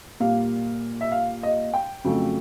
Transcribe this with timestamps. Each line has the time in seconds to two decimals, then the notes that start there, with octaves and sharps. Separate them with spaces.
0.20 A#2 G3 A#3 F5
1.01 E5
1.12 F5
1.43 D#5
1.74 G5
2.04 F2 C#3 F#3 A3